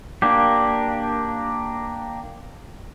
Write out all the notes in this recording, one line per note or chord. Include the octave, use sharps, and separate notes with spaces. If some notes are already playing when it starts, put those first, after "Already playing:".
A#3 D4 G4